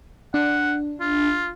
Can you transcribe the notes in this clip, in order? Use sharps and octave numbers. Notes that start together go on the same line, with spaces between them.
D4 F#5
F4